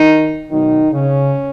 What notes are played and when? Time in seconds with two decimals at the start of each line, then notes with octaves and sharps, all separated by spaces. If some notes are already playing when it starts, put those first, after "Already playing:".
Already playing: D#3 D#4
0.51 B1 B2 D#3 F#3 D#4
0.92 C#3 C#4